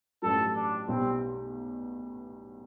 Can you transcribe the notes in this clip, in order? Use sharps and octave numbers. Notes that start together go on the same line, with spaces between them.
A1 G2 F#3 A4
D4
B1 B2 G3 C4